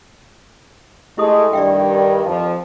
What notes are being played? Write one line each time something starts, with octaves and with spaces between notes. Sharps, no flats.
G#3 A3 E4 G4 D#6
G2 D#3 G3 D5 E5 G5
F2 F3